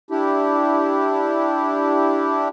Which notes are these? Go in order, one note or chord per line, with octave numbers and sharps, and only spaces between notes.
D4 E4 G4